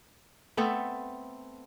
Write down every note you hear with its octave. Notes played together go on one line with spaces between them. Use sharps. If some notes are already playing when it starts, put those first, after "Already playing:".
A3 B3 C4 A4